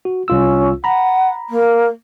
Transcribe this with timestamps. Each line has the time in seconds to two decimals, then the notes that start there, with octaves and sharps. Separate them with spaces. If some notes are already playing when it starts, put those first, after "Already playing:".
0.05 F#4
0.28 C2 C#4 F4 E6
0.84 F#5 A#5 B5
1.49 A#3